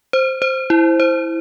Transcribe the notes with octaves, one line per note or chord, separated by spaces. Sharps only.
C5
C5
E4
C5